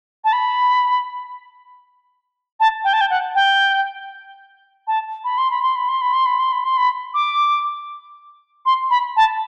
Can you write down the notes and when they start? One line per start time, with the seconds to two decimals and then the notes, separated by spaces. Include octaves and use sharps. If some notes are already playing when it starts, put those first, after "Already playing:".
0.24 A5
0.33 B5
2.60 A5
2.84 G5
2.93 A5
3.01 G5
3.10 F#5
3.35 G5
4.87 A5
5.24 B5
5.38 C6
5.51 B5
5.62 C6
5.76 B5
5.88 C6
6.01 B5
6.13 C6
6.26 B5
6.39 C6
6.52 B5
6.64 C6
6.77 B5
7.14 D6
8.66 C6
8.90 B5
9.16 A5